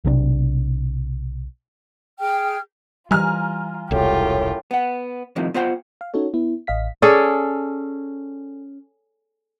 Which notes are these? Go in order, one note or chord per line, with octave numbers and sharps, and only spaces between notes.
B1 C3 C4 D4
G#4 G5 F6
E3 G3 F4 G#5 A#5 F6
E1 C2 F#2 A2 F4 G4
B3 F#5
F2 A2 C3 D#3 F3
B3 F4 C5 F#5 G5
F5
C#4 D#4 F#4 A4 C#5
B3 E4
A1 D#5 F5 B6
C#4 G#4 A4 D5